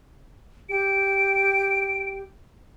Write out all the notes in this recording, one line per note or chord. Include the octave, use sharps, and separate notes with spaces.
G4 D7